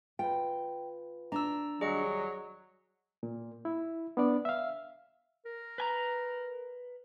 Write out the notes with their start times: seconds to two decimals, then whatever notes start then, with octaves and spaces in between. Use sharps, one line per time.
0.19 F4 B4 G5
1.32 D4 A#5 E6
1.81 D#2 F#3 G3 G#4 D5 D#5 C#7
3.23 A#2
3.65 E4
4.17 B3 D4 D5
4.45 E5 F5
5.45 A#4
5.78 B4 G#5 A#5